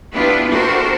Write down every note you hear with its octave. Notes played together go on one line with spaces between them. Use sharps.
B3 D4 E4 F4 G4 B4
D4 F#4 G4 A4 A#4 C5